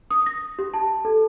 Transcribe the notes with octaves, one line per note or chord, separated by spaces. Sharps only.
D#6
A#6
G4
A5
A4